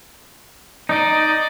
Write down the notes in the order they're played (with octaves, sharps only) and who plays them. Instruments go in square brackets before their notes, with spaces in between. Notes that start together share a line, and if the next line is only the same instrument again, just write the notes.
[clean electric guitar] D#4 [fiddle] D5 D#5